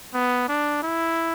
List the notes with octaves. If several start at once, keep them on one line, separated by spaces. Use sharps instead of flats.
B3
D4
E4